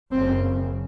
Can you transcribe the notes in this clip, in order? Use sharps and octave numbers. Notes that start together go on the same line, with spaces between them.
F#1 F#2 C#3 C4